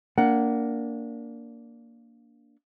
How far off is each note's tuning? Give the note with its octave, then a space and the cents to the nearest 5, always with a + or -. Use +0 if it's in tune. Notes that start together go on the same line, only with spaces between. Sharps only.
A#3 +0 D4 -15 F#5 +15